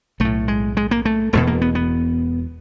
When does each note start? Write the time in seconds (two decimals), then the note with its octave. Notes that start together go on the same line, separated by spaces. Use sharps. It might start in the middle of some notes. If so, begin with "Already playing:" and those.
0.20 B1 A2 A3
0.48 G#3
0.77 G#3
0.91 A#3
1.05 A3
1.33 E1 E2 B2 A3
1.47 A#3
1.62 B3
1.75 B3